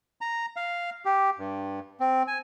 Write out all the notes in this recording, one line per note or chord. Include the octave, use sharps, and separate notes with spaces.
A#5
F5
G4
G2
C4
G#5